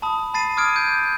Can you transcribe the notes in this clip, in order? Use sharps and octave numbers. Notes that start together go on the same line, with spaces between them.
A5 B5 D#6
A5 B5 A6 C7 D#7
D6 D#6 F6 G#6 D7 D#7
G6